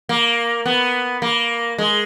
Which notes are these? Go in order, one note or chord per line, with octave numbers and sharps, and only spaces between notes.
A#3
B3
A#3
G#3